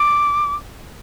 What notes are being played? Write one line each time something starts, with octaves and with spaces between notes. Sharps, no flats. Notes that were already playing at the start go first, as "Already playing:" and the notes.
Already playing: D6